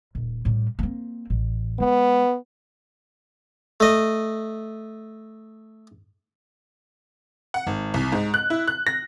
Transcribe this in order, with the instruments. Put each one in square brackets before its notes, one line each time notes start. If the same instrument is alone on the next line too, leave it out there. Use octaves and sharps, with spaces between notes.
[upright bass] D#1
A2 G3
A#3 C4
A1
[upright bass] G#3 [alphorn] B3
[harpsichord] A3 D#5
[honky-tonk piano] F#5
G#1
C2
G#2
F#6
E4
F#6
A#6